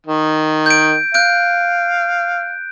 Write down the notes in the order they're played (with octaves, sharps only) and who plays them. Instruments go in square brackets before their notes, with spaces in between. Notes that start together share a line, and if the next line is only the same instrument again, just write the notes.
[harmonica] D#3
[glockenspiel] G6 D7
[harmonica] F5 [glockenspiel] F#6 G6 D7